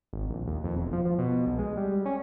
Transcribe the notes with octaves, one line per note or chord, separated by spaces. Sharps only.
G#1
A#1
D#2
F2
E1
F3
F3
B2
B1
G#3
G3
C#4